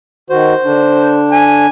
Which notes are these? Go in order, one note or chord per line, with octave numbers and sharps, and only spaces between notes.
D#3 F#4 C5
D3 D4
G#5